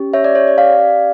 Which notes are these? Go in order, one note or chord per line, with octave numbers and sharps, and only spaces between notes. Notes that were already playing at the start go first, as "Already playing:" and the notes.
Already playing: C#4 G4
C#5 E5
D5
C#5
D5
D5 F5